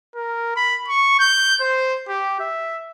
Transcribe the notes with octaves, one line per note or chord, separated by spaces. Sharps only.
A#4
B5
C#6
G6
C5
G4
E5